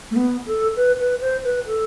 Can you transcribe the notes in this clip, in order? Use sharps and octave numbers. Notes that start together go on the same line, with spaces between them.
A3
B3
A4
B4
B4
C5
B4
A4